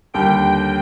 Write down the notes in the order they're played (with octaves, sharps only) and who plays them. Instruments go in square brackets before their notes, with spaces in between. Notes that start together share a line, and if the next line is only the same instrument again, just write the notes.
[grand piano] D#2 D3 G3 [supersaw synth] G5